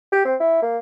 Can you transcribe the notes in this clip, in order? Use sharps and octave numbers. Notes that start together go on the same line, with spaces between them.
G4
C4
E4
A#3